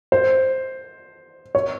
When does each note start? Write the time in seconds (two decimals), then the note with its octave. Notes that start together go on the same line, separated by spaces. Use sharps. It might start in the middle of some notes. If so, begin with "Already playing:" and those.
0.12 C5
1.55 C#5